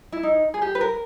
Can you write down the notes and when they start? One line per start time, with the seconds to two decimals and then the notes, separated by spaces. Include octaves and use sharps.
0.12 E4
0.23 D#4
0.54 G#4
0.62 G4
0.75 B4
0.81 A#4